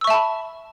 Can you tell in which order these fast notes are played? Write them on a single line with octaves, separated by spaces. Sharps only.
E6 C#6 E5 A5 B5